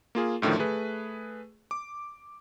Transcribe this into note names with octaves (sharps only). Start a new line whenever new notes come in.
A#3 F4 G#4
F#2 A2 D3 D#3 F3
A3 G#4 B4
D6